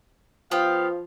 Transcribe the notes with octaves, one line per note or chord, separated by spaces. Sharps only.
F3 B3 G4 F5